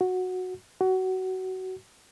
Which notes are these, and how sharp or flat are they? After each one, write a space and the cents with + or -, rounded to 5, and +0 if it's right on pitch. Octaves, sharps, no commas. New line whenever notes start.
F#4 -10
F#4 +20